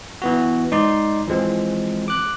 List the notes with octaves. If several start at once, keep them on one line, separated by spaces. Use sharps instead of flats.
E3 B3 F#4
G#2 D#4 D5 C6
E3 F3 G#3 C4
D6 F#6